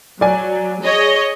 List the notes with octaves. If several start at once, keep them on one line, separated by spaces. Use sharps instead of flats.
F#3 D5 G#5
G#4 C#5 D#5